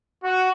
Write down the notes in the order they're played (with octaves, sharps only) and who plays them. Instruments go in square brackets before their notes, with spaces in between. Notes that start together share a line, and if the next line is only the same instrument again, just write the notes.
[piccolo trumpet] F#4